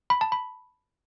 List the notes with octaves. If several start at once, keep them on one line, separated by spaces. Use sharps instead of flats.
B5
A5
B5